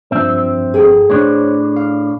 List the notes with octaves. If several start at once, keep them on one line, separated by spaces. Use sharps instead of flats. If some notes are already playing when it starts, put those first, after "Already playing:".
G2 F3 C4 E5
G#4 A4 G5
A2 D4 C5 C#5
F5